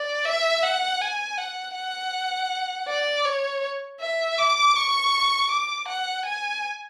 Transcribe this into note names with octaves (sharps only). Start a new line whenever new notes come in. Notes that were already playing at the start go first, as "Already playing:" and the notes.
Already playing: D5
E5
F#5
G#5
F#5
F#5
D5
C#5
E5
D6
C#6
D6
F#5
G#5